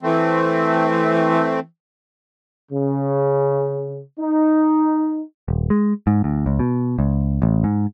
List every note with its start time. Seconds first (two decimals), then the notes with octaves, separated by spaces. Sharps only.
0.03 E3 A3 C4
2.72 C#3
4.19 D#4
5.48 D#1
5.70 G#3
6.07 G#2
6.24 D2
6.46 C#2
6.59 B2
6.99 C#2
7.42 A1
7.64 G#2